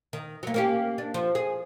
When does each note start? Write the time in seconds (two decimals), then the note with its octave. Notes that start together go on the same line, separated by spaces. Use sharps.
0.13 D#3
0.43 F#3 A#3
0.54 A#3 C#4 G4
0.98 D4
1.14 F3
1.35 G#4